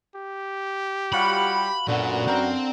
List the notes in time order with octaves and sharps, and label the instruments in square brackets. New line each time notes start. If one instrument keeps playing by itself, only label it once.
[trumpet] G4
[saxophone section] G3 F4 F#5 [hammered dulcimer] F#4 C#5 F5 [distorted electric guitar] B5
[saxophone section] F#2 [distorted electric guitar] A#2 [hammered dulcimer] D3 B3 [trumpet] F#4
[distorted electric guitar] C4 C6 [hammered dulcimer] A#4 G5 A#5